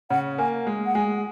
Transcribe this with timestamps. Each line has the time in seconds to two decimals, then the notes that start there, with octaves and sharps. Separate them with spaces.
0.10 C#3 F#5
0.38 A#3 G#5
0.67 G#3
0.86 F#5
0.95 G#3 G#5